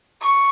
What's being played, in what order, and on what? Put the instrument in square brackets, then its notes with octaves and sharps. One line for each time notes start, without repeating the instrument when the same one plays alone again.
[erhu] C#6